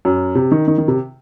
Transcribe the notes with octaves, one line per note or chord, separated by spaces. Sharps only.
F#2
C3
D#3
D#3
D#3
C3